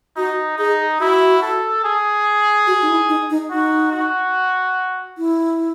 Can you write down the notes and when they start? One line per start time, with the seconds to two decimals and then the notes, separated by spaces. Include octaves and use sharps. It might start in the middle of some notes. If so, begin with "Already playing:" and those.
0.17 D#4 F#4
0.58 D#4 G#4
1.00 E4 F#4
1.42 A4
1.84 G#4
2.67 F#4
2.82 D#4
2.89 E4
3.09 D#4
3.30 D#4
3.50 D#4 F#4
3.92 F#4
5.18 E4